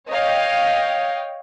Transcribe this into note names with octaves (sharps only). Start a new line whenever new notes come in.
C#5 D#5 F5 G5